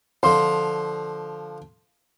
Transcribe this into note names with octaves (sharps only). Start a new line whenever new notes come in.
D3 F3 C6